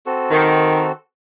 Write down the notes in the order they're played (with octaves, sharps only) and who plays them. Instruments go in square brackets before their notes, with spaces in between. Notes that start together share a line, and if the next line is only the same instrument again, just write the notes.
[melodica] C4 F#4 A4
[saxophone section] D#3